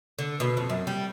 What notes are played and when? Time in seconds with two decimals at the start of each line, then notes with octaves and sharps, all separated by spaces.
0.19 D3
0.40 B2
0.57 F2
0.70 F#2
0.87 G3